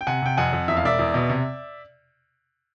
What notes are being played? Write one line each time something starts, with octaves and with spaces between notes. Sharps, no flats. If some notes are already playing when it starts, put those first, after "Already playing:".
G5
C3 F#5 G#5
C3 G5
F2 F#5 G#5
F2
E2 E5
F5
E1 D5 E5
E2
B2
C3